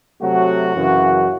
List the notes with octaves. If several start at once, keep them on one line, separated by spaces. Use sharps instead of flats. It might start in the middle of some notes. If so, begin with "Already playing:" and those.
C3 F#3 A3 F#4
F#2 C#3 E3